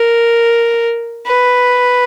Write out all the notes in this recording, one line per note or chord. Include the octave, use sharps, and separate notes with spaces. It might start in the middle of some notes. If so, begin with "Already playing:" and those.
Already playing: A#4
B4